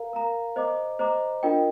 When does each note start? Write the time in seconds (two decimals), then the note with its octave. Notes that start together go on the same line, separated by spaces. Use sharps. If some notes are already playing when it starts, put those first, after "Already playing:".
Already playing: A#4 F5 A#5
0.13 A#4 F5 A#5
0.56 C5 D#5 A#5 D6
0.99 C5 D#5 A#5 D6
1.43 D4 F4 A#4 D#5 G5